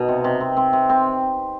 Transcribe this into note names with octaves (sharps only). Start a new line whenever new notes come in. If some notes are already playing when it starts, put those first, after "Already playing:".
Already playing: B2 D#4
C3
C3
C4
C4
C3
C4